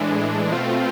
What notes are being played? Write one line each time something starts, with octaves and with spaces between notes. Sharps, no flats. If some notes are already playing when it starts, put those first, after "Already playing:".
Already playing: A2 E3 G#3 D4
B2 A3 C4 F4